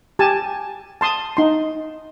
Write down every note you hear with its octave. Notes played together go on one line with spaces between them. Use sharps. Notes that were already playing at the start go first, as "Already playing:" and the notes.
G4 G#5 A5
A5 C6 D#6
D#4 C6